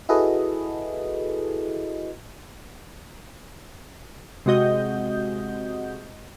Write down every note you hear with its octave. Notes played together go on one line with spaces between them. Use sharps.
E4 F#4 G#4 A4 B4 D#5
C3 G#3 F#4 D#5 G6